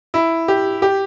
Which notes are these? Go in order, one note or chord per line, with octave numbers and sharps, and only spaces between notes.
E4
G4
G4